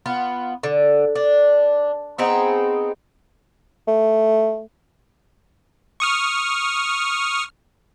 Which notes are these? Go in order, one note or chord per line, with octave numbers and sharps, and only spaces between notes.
B3 F4
D3
D4
B3 C4 D#4 G#4
A3
C#6 D#6 F6